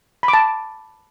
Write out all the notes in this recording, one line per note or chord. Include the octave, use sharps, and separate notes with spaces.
B5
D6
A5